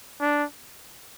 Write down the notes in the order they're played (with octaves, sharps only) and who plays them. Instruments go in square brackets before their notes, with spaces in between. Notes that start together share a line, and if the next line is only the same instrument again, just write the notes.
[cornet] D4